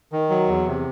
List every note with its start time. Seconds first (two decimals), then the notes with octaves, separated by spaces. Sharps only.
0.12 D#3
0.30 F#3
0.48 E2
0.67 C3